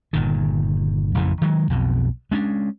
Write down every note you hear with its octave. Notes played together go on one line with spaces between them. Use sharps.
G1 A#2 D#3
A1 F2 C#3 E3
D#3 F#3 G#3
B1 F2 B2
G#3 C#4 D4